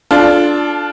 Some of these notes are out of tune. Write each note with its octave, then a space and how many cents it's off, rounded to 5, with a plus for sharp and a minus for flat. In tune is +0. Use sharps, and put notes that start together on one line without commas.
D4 +0 F4 +0 A4 -25